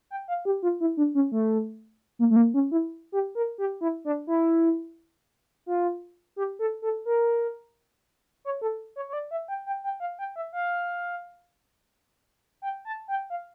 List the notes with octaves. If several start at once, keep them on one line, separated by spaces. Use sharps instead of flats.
G5
F5
G4
F4
E4
D4
C#4
A3
A#3
A3
A#3
C#4
E4
G4
A#4
G4
E4
D4
E4
F4
G4
A4
A4
A#4
C#5
A4
C#5
C#5
D5
E5
G5
G5
G5
F5
G5
E5
F5
G5
A5
G5
F5